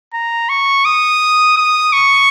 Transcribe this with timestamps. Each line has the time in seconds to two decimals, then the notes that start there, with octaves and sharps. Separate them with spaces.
0.13 A#5
0.49 C#6
0.85 D#6
1.57 D#6
1.93 C#6